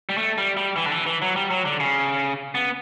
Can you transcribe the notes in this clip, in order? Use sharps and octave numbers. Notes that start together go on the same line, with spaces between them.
G3
A3
G3
G3
E3
D3
E3
E3
F#3
G3
F#3
D3
C#3
B3